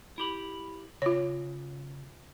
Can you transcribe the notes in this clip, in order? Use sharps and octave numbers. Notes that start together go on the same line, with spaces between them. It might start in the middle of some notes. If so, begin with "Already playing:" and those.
E4 G4 B5
C#3 F4 C#5